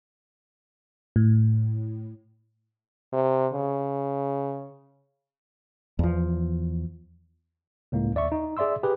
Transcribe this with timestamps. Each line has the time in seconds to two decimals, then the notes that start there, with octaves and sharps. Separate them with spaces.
1.16 A2
3.13 C3
3.53 C#3
5.99 E2 F3
7.92 C#2 A2 A#3
8.15 D#2 D5 E5 C#6
8.32 D#4
8.57 G#4 D5 E5 C6 E6
8.83 G4 G#4 B4